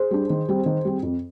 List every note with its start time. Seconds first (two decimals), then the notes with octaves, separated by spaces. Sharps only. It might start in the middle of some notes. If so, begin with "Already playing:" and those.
Already playing: G#4 C5
0.11 G3 D4
0.30 D#3
0.49 G3 C4
0.66 D#3
0.85 G3 C4
1.03 F2